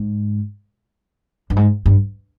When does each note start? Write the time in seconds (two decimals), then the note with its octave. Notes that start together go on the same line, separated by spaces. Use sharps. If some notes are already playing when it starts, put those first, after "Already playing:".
Already playing: G#2
1.50 G2
1.56 G#2
1.86 G2